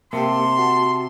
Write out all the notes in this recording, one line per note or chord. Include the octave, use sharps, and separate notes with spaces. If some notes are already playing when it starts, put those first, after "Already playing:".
C3 A#3 G4 A5 C6
F#4